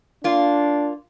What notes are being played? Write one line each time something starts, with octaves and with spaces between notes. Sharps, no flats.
A#3 D4 F4